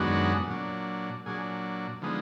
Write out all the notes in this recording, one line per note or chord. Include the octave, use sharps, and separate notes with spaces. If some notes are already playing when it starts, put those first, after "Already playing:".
Already playing: F#2 D#3 G#3 B3 D4 F#4
A#2 F#3 D4
A#2 F#3 D4 G#4
D3 F3 G#3 B3 D#4